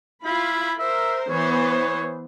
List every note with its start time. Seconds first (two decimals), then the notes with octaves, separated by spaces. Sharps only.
0.24 E4 F4 B5
0.79 A#4 C5 E5
1.29 E3 B3 C5 C#5